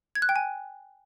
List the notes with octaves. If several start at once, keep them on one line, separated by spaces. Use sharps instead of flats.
G#6
F#6
G5
G#5